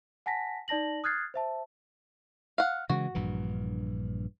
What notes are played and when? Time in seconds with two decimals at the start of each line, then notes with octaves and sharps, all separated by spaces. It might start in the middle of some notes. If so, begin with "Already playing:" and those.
0.26 F#5 G#5 A5 A#6 B6
0.68 D#4 D5 A5 A#6 F#7
1.04 D#6 F6 F#6 G#6 A6 C7
1.34 C5 E5 A5
2.58 F5 F#5
2.89 C#3 E3 G#3 F#4
3.15 A#1 G2 E3